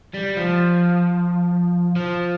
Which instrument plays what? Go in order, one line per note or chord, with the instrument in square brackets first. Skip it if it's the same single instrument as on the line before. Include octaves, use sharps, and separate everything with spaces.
[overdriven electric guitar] G3
F3
F3